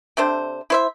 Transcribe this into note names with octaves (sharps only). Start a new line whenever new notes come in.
C3 A3 D4 C5
E4 C5 E5